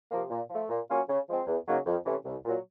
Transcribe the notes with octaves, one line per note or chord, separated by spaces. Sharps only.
C3 F3 A#3
A#2
F3 A3
A#2
F#3 A#3 C#4 F4
C#3
F3 G#3 C4
E2
C#3 F#3 A#3 D#4
F2
C3 E3 A3 C#4
C2
A#2 F#3